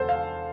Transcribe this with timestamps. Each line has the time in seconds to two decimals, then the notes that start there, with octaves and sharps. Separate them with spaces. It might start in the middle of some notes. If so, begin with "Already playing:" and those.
Already playing: E2 D3 A4 C5
0.09 F5